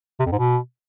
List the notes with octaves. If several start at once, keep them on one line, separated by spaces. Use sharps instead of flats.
C3
F2
G#2
B2